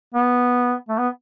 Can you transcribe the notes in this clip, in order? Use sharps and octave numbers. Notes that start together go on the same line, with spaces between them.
B3
A3
B3